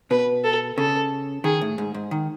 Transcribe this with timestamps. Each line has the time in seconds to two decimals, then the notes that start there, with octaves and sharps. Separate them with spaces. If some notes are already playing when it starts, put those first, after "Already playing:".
0.11 B2 B4
0.44 A4
0.78 C#3 A4
1.44 D#3 G#4
1.61 A2
1.78 G#2
1.94 G#2
2.11 D#3